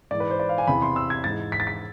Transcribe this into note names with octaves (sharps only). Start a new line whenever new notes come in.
G#2 E3 D5
B4
C5
D5
F5
G#5
E2 C3 E3 B5
C6
E6
G#6
G#2 E3 A6
B6
A6
B6